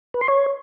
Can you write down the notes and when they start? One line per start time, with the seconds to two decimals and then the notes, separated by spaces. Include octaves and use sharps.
0.14 B4
0.21 C6
0.28 C#5